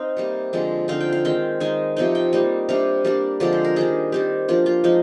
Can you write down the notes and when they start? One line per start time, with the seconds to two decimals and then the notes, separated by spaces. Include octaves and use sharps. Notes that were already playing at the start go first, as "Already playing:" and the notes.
Already playing: C4 D#4 F5
0.17 C3 G3 A#3
0.53 D3 F3 G#3 C4
0.88 D3 F3 C4 D#4 F5
1.01 G5
1.13 F5
1.25 D#3 G#3 C4 G5
1.60 D#3 G#3 D#4 G#5
1.96 C3 F3 C4 D#4 G5
2.15 G5
2.33 G3 A#3 D#4
2.69 C3 G3 D4 F5
3.05 G3 A#3 D4
3.40 D3 F3 G#3 C4 D5
3.53 C5
3.65 A#4
3.76 D#3 G3 D4 G#4
4.12 D#3 G3 C4 G4
4.48 F3 A#3 D4 F4
4.66 F4
4.84 F3 G#3 D#4